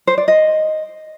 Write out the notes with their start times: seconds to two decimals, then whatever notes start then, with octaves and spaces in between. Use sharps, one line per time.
0.07 C5
0.18 D5
0.28 D#5